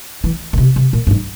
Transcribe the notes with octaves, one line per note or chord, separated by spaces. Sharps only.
E3
A#2
C3
C3
A#2
G2
G#2